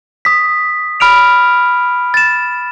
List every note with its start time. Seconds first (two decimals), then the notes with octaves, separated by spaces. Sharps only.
0.25 D#6 B6
1.00 B5 F6 D7 F7
2.14 A6 E7